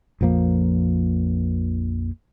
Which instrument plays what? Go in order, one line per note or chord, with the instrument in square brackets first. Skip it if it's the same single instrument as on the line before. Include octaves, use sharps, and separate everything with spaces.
[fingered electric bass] A#1 F2 F3 A#3